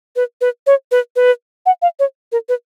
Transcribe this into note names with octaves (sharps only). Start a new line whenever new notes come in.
B4
B4
C#5
B4
B4
F#5
F5
C#5
A#4
B4